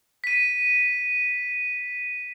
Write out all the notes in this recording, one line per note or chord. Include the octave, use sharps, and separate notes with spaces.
B6 D#7